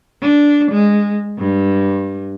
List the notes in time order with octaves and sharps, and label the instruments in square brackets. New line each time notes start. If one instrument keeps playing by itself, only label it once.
[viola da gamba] D4
G#3
G2